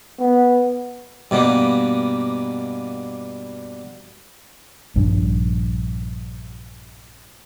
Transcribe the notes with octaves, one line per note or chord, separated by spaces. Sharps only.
B3
G2 B2 G3 A#3
A#1 G2